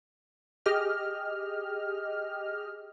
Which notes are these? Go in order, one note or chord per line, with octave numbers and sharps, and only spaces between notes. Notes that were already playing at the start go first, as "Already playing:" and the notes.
G4 G#4 D#5 F6